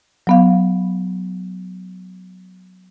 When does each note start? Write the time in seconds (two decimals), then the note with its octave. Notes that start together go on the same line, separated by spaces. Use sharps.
0.27 F#3 B3 F5